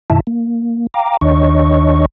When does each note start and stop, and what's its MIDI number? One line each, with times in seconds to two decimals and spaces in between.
0.10 0.20 42
0.10 0.20 47
0.10 0.20 51
0.10 0.20 64
0.10 0.20 76
0.10 0.20 81
0.27 0.87 58
0.94 1.17 77
0.94 1.17 79
0.94 1.17 82
0.94 1.17 86
1.21 2.06 39
1.21 2.06 51
1.21 2.06 62
1.21 2.06 73
1.21 2.06 75
1.21 2.06 85